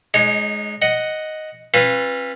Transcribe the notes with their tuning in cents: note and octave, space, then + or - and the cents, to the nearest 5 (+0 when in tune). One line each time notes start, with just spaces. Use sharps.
G#3 +20 D#4 -15 C#5 +0
D#5 +0 F#5 +0
C4 +45 F4 +0 B4 +0